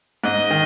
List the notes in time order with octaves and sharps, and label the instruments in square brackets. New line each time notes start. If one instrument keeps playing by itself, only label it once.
[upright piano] G#2 [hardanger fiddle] D#5
[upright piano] D#3